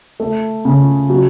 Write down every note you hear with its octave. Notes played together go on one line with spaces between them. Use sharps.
A3
C#3
F#3